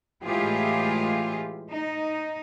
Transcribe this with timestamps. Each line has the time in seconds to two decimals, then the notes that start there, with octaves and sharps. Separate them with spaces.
0.24 A2 E3 G#3 F4 G4 G#4
1.71 D#4